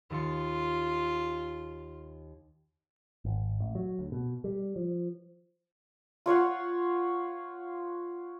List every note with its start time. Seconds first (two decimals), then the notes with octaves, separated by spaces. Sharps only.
0.10 D#2 F4 A6 C#7
3.25 G#1
3.60 A1
3.75 F#3
3.99 D2
4.12 B2
4.44 G3
4.76 F3
6.26 F4 C#5 F5 F#5